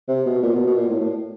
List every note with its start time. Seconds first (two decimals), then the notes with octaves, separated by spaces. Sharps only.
0.08 C3
0.26 B2
0.43 A#2
0.54 B2
0.66 B2
0.77 A#2
0.89 A2
1.00 A2